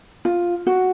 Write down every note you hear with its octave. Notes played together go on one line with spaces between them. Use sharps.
F4
F#4